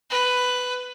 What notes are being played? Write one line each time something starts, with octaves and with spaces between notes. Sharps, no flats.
B4